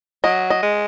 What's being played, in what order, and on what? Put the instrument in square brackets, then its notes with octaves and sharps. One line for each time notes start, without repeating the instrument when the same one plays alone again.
[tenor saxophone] F#3 [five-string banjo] D#5
[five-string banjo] D#5
[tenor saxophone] G#3